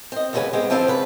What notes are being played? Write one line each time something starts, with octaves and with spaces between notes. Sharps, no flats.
C4 D#5
D2 G2 C#3 F#3 B4 G#5
G#3 B3 C4 G4
D3 F3 C4 E4 A4 F5
C#3 B4